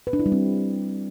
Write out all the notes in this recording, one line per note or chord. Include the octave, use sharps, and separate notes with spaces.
B4
D4
E4
G3
C4